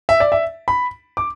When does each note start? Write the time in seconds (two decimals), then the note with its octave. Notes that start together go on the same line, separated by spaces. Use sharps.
0.09 E5
0.20 D5
0.32 E5
0.68 B5
1.17 D6